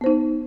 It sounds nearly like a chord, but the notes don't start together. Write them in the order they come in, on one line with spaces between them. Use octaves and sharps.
B3 C5 D#4